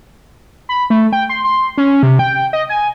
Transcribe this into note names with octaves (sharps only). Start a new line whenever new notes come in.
B5
A3
G5
C6
C6
C#4
C3
G5
D#5
G#5